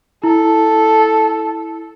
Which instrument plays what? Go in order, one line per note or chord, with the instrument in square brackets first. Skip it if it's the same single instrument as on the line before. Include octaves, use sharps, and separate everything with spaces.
[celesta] E4 [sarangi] A4